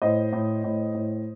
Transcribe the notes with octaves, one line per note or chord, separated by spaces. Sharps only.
A2 C5 D#5
A2
A2
A2